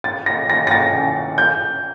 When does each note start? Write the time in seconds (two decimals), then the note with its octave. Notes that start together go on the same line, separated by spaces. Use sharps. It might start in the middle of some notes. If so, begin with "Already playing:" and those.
0.04 A6
0.26 A#6
0.50 A#6
0.67 A#6
0.71 A6
1.38 G6